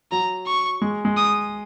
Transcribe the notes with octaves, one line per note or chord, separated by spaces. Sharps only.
F#3 A#5
C#6
G#3
G#3
D#6